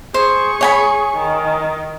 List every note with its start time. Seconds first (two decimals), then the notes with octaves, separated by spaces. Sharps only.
0.14 G#4 C5 C#6
0.61 C#5 G#5 B5
1.17 D#3